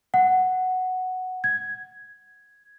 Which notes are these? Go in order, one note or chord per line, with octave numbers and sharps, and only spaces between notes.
F#5
G#6